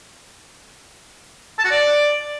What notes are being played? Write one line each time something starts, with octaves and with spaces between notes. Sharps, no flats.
A5
F#4
D5